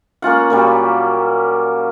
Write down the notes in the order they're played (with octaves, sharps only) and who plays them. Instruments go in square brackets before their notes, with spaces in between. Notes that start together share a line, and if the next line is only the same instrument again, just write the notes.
[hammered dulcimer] A#3 C#4 F4 F#5
A#2 F#3 G3